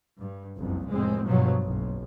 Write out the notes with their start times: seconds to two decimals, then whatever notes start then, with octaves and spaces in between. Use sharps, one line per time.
0.19 G2
0.57 F#1 C2 F2
0.88 F1 A2 G#3 C4
1.26 G2 B2 F3 F#3
1.59 F#1 B1